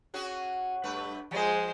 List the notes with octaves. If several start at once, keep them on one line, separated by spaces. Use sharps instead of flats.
C#4 F#4 G#4
G2 A3 B4
F3 G#3 G#4 C5